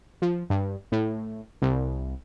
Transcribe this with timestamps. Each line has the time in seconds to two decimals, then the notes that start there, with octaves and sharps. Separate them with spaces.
0.22 F3
0.50 G2
0.92 A2
1.62 C2